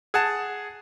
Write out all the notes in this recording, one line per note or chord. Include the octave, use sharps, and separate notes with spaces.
G#4 F#5 A5